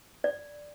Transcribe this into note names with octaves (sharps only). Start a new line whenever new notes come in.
D5